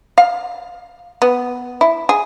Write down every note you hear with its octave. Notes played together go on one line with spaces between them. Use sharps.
F5
B3
E4
G#4